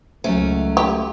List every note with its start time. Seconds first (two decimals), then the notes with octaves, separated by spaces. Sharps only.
0.24 C#2 F#3 A3 A#3 C#4
0.77 G4